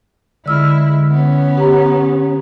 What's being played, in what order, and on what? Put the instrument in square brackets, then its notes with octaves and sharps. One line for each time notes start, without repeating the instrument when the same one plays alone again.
[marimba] D3 E6 F6 [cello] G#3 E4
[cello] B3 C#4
[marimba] G4 A#5